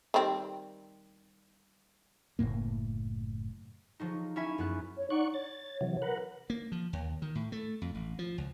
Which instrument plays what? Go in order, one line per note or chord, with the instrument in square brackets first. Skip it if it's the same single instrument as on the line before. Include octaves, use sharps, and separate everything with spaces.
[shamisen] D#3 G3 C4
[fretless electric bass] F#1 F2 A2 A#3
[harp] F3 F#3 D#4
C#4 E4 E5 G#5
F#2 B3 F#6
[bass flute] C#5
[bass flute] D#4 [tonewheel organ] D5 F#5 C#6
[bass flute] C#5 [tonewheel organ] A6
[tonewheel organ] C3 E3 F#3
A#4 B4 F#5
[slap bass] A#3
F3
D#2
D#3
A2
A3
F2
A1
F3
C#2